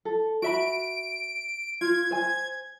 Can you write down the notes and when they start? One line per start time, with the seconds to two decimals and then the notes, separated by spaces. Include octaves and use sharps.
0.05 A4
0.42 F#4 E5 B5 D7
1.81 F4 G#6
2.11 C5 G#5